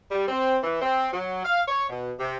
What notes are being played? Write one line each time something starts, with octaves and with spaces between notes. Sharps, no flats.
G3
C4
E3
C4
F#3
F5
C#5
B2
C3